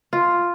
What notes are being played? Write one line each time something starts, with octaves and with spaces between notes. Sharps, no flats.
F4